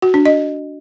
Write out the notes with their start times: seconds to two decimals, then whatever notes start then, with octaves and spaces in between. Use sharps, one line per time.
0.02 F#4
0.14 D4
0.25 D#5